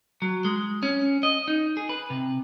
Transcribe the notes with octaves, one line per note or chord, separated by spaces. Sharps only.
F#3
G#3
C#4
D#5
D#4
G#4
B4
C3